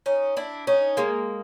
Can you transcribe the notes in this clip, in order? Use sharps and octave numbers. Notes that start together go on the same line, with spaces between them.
C#4 D#4
D4 E4
C#4 D#4
G#3 A#3